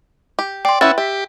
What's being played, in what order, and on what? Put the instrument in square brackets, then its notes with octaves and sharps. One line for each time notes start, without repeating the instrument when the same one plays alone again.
[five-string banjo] G4
[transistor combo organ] D5 [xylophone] G5 C6
[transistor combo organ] C#4 E5 [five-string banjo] E4 B4 F#5 [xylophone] A6
[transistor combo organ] G4 [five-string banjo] E5